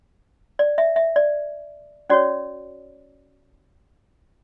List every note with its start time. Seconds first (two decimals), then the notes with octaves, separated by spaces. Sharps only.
0.59 D5
0.78 E5
0.96 E5
1.16 D5
2.10 C#4 F#4 C#5 D5